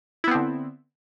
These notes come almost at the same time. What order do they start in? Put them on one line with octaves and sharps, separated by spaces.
E4 B3 C4 D3